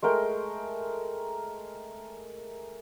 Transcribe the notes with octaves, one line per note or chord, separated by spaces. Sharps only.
G#3 A3 A#4 G5